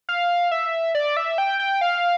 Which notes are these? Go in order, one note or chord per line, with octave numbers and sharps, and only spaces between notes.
F5
E5
D5
E5
G5
G5
F5